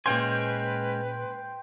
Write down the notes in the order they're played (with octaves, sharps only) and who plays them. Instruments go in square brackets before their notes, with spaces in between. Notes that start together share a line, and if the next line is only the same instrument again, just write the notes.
[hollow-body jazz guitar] A#2 C6 [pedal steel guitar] G#3 C#4 G#5 [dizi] B4 [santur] C5 G5